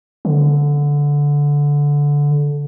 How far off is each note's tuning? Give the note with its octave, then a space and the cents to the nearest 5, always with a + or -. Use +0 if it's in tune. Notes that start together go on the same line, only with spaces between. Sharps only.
D3 -15